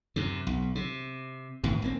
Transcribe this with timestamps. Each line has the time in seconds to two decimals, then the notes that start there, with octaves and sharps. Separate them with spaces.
0.16 F#2 C3
0.47 B1
0.75 C3
1.64 G1 A2 D#3
1.82 G1 A#3 C4